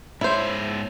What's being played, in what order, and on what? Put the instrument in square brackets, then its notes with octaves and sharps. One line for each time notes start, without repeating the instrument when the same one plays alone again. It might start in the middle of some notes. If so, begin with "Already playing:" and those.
[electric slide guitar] G#2 C#5 [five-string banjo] E4 C5